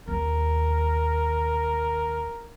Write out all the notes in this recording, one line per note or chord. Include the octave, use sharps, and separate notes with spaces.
D#2 A#4